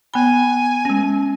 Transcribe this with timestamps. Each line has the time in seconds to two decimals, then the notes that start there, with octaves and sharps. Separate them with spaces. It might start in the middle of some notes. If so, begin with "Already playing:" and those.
0.14 B3 G#5 B5
0.85 G#3 C#4